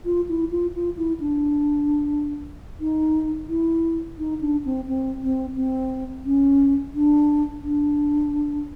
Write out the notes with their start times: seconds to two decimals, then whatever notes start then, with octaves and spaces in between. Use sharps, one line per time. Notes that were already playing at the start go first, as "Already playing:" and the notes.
0.05 F4
0.29 E4
0.51 F4
0.74 F4
0.97 E4
1.20 D4
2.80 D#4
3.49 E4
4.18 D#4
4.41 D4
4.65 C4
4.88 C4
5.22 C4
5.56 C4
6.26 C#4
6.94 D4
7.63 D4